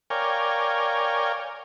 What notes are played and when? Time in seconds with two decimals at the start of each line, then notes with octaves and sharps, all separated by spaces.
0.10 A#4 C#5 D5 F5 G5 G#5